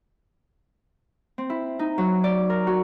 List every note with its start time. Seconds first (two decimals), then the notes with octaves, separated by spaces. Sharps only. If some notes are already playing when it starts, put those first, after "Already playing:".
1.38 C4
1.50 E4
1.79 D#4
1.98 F#3
2.24 D5
2.50 A#4
2.67 F#4